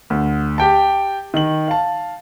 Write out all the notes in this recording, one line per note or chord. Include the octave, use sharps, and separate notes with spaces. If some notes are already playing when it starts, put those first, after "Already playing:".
D2
G4 G5 A5
D#3 F#7
F5 A5